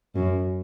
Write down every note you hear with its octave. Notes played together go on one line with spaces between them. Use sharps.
F#2